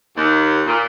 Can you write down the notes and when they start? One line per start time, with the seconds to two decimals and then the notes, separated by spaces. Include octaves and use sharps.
0.16 D#2
0.67 A#2